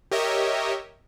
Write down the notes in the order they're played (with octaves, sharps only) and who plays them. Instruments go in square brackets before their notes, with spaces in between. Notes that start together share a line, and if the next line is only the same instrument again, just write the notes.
[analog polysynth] G4 A#4 C#5 D#5 E5